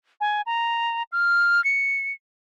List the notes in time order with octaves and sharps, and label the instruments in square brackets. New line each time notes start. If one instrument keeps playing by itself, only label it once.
[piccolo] G#5
A#5
F6
C#7